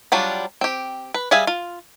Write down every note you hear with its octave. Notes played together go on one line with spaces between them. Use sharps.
F#3 G3 D4 F4
C4 G4
B4
G3 G#4 E5 F5 G#5
F4